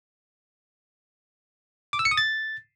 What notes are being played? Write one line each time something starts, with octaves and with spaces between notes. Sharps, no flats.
D6
E6
C#7
D#6
A6